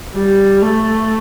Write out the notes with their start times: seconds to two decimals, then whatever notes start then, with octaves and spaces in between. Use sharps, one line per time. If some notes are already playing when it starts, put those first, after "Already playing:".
0.14 G3
0.62 A3